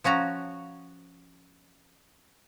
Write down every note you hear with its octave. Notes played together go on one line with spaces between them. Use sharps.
F3 C#4 F#4 A#5